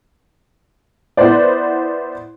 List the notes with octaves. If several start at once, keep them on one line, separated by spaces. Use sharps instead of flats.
B3 E4 B4 C5 D5